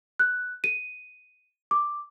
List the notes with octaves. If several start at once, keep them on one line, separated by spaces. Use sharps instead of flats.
F#6
D#7
D6